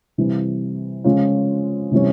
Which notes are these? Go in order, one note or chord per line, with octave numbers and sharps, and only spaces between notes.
C3 E3 G3
C#3 F3 G#3 C#4 F4
C3 E3 G3 C#4